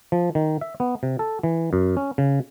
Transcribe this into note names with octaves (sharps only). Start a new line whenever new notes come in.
F3
D#3
E5
B3
C3
A4
E3
F#2
C#4
C#3